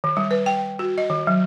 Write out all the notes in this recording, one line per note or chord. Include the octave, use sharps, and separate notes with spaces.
D#3
G3
B4
G5
F#4
D#5
D#3
F#3